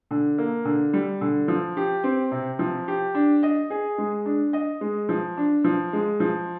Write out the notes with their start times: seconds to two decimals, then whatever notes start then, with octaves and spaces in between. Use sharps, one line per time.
0.11 D3
0.38 A#3
0.65 D3
0.93 G3
1.21 D3
1.48 F3
1.77 G4
2.04 C4
2.31 C3
2.59 F3
2.88 G4
3.15 D4
3.43 D#5
3.70 G#4
3.98 G#3
4.26 D4
4.53 D#5
4.81 G#3
5.09 F3
5.37 D4
5.64 F3
5.93 G#3
6.20 F3